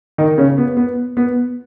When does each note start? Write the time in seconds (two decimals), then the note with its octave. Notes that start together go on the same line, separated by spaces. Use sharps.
0.18 D#3 D#4
0.38 C#3 C#4
0.58 B3
0.77 B3
1.17 B3